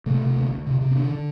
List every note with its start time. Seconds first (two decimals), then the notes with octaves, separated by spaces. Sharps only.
0.06 C3 A3
0.22 C3
0.36 D2
0.51 D2
0.67 C3
0.81 C3
0.91 C4
0.96 D3 D4
1.11 D3